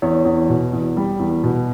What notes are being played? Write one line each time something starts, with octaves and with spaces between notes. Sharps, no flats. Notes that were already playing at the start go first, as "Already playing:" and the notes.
E2 C#5
E2
B2
E2
G3
E2
B2